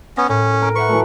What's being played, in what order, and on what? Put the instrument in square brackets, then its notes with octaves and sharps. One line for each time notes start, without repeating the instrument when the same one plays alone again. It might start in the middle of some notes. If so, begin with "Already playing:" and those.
[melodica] B3 C#4 [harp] A#6
[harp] A2 [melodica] C#4
[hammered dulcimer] A#4
[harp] B4 E5 F#5 [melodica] C#6
[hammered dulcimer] E3 F#3 A3